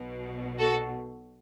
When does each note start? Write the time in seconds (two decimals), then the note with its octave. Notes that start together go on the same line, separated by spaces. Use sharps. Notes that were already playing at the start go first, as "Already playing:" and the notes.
Already playing: B1 B2
0.59 F#4 A4